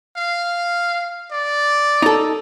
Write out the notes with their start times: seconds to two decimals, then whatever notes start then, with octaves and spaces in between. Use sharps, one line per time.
0.16 F5
1.32 D5
2.02 D#4 A4